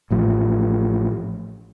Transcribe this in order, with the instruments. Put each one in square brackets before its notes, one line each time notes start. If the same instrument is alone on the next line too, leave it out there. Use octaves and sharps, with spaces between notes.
[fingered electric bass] A1 A2 F3